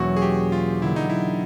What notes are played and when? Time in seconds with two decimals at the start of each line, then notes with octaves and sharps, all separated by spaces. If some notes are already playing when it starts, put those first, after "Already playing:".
Already playing: E2 B2 F#3 A#3 C#4 F#4
0.16 G#4
0.22 G4
0.52 F4
0.82 D3 F#3 A#3 E4
0.96 D#4
1.10 E4